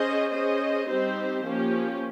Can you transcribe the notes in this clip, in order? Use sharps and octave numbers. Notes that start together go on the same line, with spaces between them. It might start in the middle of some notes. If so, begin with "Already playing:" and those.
Already playing: C#4 G#4 C5 D#5
C#4 G#4 C5 D#5
G3 C4 D#4 G4 C5
F3 A#3 C#4 G4